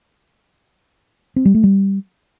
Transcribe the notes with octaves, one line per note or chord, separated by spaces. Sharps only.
C4
G3
A3
G3